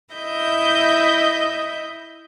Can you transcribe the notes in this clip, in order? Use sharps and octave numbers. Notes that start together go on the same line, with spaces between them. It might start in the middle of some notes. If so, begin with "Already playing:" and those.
E4 D#5 E5 G6